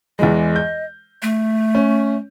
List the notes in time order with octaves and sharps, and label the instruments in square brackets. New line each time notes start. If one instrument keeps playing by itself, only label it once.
[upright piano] E2 E3 G#3 [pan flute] D#5
[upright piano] G6
[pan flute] A3
[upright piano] C#4